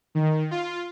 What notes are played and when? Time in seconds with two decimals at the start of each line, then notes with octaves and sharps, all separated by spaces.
0.15 D#3
0.51 F4